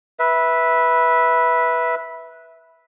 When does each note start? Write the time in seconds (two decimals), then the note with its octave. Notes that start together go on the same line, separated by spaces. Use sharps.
0.19 B4 E5